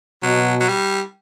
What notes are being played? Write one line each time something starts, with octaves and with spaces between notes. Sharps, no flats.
B2 F#3
F#3
G3